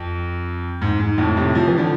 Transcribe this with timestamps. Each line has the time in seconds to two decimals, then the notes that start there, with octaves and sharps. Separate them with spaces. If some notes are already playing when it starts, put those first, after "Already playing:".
Already playing: F2
0.81 G#2
1.00 G#2
1.18 F2 A2
1.37 A2 C3
1.55 F3
1.67 E3
1.78 D3 F3